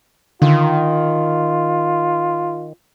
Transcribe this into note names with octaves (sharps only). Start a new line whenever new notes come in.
D3 D#3 F4